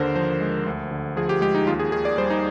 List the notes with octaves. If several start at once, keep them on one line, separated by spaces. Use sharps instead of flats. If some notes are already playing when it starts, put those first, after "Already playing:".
Already playing: D#2 D3 A#4 C5
F3 C5
G#3
D2
D3
F3 G#4
G4
G#3 G4
D#4
D#2 F4
G#4
D#3 G#4
D5
G3 C5
D#4